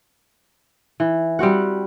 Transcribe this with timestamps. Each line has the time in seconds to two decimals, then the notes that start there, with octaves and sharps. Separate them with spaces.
1.00 E3
1.39 G3 C4 F#4 F#5